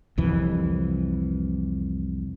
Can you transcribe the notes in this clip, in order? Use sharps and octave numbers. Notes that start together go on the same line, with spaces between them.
C2 F2 E3